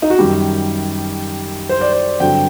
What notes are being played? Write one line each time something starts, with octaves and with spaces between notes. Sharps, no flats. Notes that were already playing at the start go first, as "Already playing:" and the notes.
D#4
F#4
F#2 D#3 G3 G4
C5
D5
C5
G2 D3 F#3 C4 G5